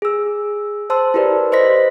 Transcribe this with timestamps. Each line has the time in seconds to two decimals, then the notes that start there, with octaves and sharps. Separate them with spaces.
0.02 G#4 E6
0.90 C5 A5 C6 E6
1.14 E4 G4 A#4 B4 D5
1.52 B4 C5 D#5 C6 A#6 B6